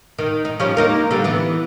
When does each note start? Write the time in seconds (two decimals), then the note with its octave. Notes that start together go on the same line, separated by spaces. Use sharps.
0.19 D#3
0.45 D#4
0.60 F3 G3 C#4
0.77 A#3 D#4 A#4
1.11 D3 G3
1.24 E3 B3